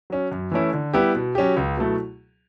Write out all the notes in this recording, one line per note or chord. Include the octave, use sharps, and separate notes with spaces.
F#3 C#4
F#2
E3 A3 C#4 E4
D3
G3 B3 E4 G4
B2
F#3 C#4 G4
C#2
B2 F#3 A3 E4